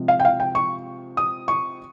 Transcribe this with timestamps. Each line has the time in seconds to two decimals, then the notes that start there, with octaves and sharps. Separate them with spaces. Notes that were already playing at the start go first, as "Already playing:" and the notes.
Already playing: C3 F3 G#3 C4
0.08 F5
0.20 G5
0.25 F5
0.40 G5
0.55 C#6
1.17 D#6
1.48 C#6